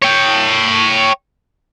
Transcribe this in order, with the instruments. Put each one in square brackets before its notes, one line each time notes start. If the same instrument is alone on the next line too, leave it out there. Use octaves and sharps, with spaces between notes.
[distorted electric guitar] C#5 G5